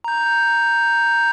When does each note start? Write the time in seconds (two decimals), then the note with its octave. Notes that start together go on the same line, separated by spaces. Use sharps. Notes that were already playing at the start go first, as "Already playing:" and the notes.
0.04 A#5 G6